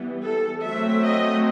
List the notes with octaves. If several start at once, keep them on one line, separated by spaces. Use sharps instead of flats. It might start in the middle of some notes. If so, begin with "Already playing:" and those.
Already playing: E3 G3 B3
A4
F#3 A3 C4 E5
D#5